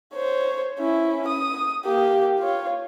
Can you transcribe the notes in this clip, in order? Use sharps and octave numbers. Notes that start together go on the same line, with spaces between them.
C5 C#5
C#4 E4
D#6
A#3 G4
F4 C#5